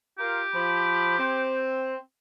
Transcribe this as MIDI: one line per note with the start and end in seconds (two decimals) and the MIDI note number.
0.18 0.42 65
0.18 1.65 67
0.18 0.42 70
0.53 1.14 53
0.53 1.14 83
1.18 1.95 60